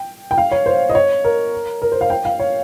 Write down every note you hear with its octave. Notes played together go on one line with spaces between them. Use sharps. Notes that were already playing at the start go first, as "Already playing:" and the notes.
Already playing: G5
G5
F5
C#5
C5
D#5
C#5
A#4
A#4
C5
F5
G5
F5
C#5